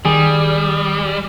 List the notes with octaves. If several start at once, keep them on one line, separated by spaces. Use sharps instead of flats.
D#3 G3 G#4